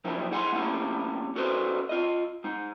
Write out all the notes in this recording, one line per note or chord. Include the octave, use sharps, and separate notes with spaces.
F3 F#3 A#3 D4 E4 G4
E4 G#4 F#5 G#5 A#5 C6
A3 A#3 C#4 E4 G4
C#4 F#4 A4 B4 C5
F4 D#5
G#3 D#4